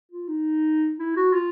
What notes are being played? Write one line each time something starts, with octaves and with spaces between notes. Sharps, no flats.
F4
D#4
E4
F#4
F4